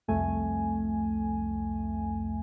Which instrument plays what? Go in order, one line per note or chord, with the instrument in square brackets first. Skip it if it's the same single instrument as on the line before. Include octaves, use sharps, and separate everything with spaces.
[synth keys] C2 F2 A3 G#5